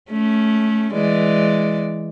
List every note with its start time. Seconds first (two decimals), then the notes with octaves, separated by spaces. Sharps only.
0.11 A3 C#4
0.93 E3 G#3 D5